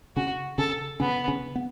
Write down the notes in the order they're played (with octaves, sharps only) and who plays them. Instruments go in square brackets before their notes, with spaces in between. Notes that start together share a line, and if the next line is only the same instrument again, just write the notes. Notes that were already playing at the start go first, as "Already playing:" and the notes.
[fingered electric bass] C#3 C#4 [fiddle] F#4
[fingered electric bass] C#3 C#4 [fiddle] A4
[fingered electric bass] C#3 C#4 [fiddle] B3
[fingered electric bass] C#3 C#4
B3